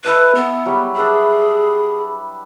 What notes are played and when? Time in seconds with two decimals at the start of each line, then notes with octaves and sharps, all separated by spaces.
0.04 E4 A4 B4 D#5
0.35 B3
0.66 F#3 G3 G#4
0.96 D4 G#4 B4 E5